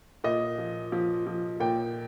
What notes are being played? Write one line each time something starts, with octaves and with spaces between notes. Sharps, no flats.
A#2 D#5
F3
F3
F3
A#2 G5